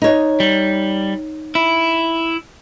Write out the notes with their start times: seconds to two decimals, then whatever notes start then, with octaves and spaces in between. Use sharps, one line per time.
0.02 D#4 C#5
0.40 G3
1.55 E4